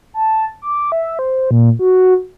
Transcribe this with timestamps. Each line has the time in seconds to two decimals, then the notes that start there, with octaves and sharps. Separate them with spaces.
0.14 A5
0.62 D6
0.92 E5
1.19 C5
1.51 A#2
1.79 F#4